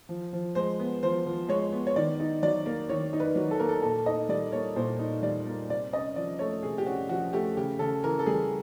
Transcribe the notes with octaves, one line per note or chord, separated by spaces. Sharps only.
F3
F3
G#3 C5
B3
F3 C5
F3
G#3 C#5
B3
C#5
D#3 D5
D#4
F#3 D5
A#3
D#3 C#5
D#4
B4
F#3
A4
A#3 A#4
A4
A#2 A4
D#4 D#5
G3 D5
A#3 C#5
A#2 C5
D#4
G3 D5
A#3
C3 D5
C#4 D#5
F3 D5
A3 C#5
C3 G#4
G4
C#4 F#4
F3 F#4
A3 G4
C#3 G4
C#3 A4
E3 A#4
A4
G3 G#4